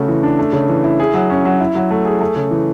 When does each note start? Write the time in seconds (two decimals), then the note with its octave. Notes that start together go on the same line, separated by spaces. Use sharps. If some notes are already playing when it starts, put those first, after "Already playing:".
Already playing: C#3 A3 F#4
0.08 E3
0.23 D4
0.39 A3
0.53 C#3
0.69 E3
0.84 E4
1.00 G#4
1.14 F#3
1.30 C#4
1.45 F#3
1.60 E4
1.75 F#3
1.90 A3
2.05 G#4
2.21 A3
2.36 C#3
2.51 E3